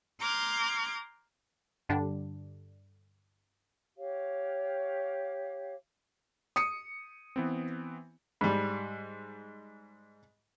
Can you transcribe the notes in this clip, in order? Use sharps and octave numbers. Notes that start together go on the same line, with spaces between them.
A#5 C6 D6 F6 G6 G#6
G2 D3 G3 D4
G4 C#5 F5
D#6 C#7
E3 B3 C4
G#2 G3